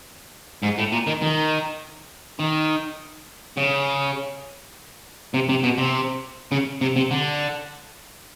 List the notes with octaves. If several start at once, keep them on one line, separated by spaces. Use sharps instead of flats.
G#2
A2
A#2
D#3
D#3
D#3
C#3
C3
C3
B2
C3
C#3
C3
C3
D3